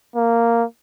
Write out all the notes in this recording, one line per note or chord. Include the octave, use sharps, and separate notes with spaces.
A#3